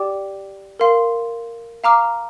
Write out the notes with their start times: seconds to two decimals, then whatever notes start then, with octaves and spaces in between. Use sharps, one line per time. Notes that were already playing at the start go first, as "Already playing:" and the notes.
Already playing: G4 D5 G5 D6
0.79 A#4 F5 C6
1.84 F5 A#5 D6 F6